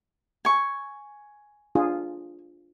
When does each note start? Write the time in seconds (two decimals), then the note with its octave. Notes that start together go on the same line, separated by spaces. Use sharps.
0.45 G#5 C#6
1.75 D4 F4 G#4